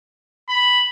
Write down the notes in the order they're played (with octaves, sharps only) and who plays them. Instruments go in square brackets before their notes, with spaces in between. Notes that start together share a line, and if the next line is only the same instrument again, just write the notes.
[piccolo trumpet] B5